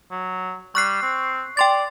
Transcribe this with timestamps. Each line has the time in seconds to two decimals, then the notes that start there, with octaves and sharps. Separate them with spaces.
0.11 F#3
0.75 G3 C#6 F#6 C7
1.02 C4
1.57 D5 G5 C6 A6